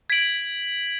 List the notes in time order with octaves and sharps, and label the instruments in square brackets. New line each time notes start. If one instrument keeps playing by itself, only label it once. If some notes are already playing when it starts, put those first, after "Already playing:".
[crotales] G#6 B6 D7 F#7